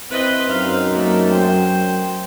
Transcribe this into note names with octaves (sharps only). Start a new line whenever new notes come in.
C4 E4 B4 D#5
F#2 D#4 F5
F#3 A3 A#3
C5 G5